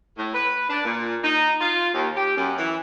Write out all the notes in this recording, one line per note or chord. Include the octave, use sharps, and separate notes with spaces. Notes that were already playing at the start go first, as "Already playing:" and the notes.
A2
B4
D4
A#2
D#4
F4
D#2
G4
F#2
E3